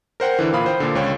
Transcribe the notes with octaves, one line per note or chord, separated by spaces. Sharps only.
A#4 C5 F#5 G5
D3 E3
A#2 F5 B5 D#6
C5 G5
A#2 D3
C#2 C#5 G5